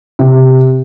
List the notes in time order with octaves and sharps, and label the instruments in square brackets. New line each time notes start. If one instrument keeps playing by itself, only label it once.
[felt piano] C3